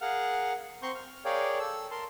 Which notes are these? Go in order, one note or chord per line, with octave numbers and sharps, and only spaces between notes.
G#4 A#4 F5 F#5 F6
C4 A#5 C6 C#6 G6
F6
G#4 A#4 C#5 D5 F5 G5
A4 E6
A#4 A5 C6